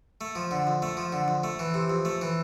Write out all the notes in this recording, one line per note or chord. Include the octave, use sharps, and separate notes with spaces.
A3
F3
D3
F2
A3
F3
D3
F2
A3
E3
C3
F2
A3
E3